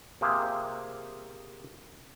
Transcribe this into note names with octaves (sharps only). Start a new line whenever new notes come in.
C3 A#3 F4 G4 G#4 C5